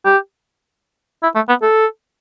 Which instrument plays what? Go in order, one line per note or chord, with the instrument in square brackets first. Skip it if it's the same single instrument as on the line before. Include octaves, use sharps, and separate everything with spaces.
[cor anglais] G4
E4
A3
B3
A4